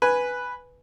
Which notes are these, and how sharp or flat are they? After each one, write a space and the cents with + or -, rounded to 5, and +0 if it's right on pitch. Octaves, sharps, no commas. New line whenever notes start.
B4 +0 G#5 +0